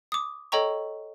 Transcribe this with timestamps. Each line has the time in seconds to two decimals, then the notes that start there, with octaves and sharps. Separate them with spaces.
0.12 D6 D#6
0.52 A4 C#5 D#5 G5 A#5 C#6